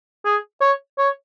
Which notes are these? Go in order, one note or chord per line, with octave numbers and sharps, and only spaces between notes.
G#4
C#5
C#5